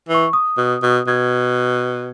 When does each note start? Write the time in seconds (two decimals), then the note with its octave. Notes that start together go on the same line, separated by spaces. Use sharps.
0.09 E3
0.14 C#6
0.33 D#6
0.58 B2
0.83 B2
1.07 B2 G#6